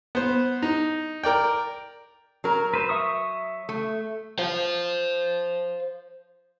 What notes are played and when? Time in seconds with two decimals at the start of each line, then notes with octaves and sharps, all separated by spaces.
0.15 B3 C5
0.62 D#4
1.24 A#4 D5 G5
2.44 F#3 A#4
2.74 B4 C5
2.89 E5 C#6 D#6
3.69 A3
4.39 C5 F5